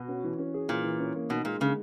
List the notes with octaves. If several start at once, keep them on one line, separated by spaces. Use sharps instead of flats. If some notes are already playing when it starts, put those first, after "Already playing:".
Already playing: B2 F#4
C#4
E3
C#4
G#4
A#2 E3
E3
C#4
A#3
B2 D#4
A#2 G#3
C#3 G#3